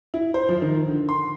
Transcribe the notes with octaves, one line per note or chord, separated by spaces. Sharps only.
E4
C5
F3
D#3
D3
C6